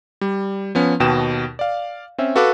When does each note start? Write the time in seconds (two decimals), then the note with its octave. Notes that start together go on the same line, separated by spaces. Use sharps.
0.21 G3
0.75 F3 B3 C#4
1.00 D#2 B2 G5 E7
1.59 D5 F5
2.18 C4 C#4 E5
2.36 F#4 A4 B4 F5 D6 F#6